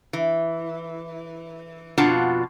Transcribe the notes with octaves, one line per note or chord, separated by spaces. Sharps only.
E3
F2 B2 D4 F4 F#5 A5